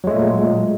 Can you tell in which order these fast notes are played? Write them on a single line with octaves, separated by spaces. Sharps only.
F#3 G#3 A3 A#2